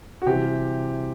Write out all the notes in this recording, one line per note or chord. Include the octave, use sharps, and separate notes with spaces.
F#4
C3 E3 G3 G4